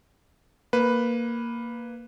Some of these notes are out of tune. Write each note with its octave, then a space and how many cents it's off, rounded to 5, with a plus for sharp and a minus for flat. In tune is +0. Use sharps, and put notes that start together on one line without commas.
A#3 +0 B4 +0